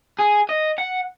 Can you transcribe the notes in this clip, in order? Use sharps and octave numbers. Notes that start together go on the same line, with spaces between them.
G#4
D#5
F#5